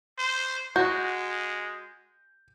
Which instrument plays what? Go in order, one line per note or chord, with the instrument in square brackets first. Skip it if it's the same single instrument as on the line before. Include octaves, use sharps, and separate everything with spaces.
[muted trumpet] C5
[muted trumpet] G#3 [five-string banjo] F#4 [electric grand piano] G6